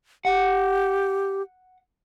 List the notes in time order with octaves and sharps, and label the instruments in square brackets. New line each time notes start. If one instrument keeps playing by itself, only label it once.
[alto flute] G4 [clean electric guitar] F#5